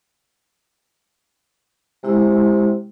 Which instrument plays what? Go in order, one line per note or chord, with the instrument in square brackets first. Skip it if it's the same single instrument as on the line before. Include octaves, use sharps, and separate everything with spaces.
[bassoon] C3 [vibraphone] G#3 E4 E6